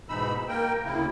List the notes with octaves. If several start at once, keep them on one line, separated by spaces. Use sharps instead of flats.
G#2 B2 E3 D#4 B5 E6
A#3 A#4 G5
D2 C#3 A#3 E4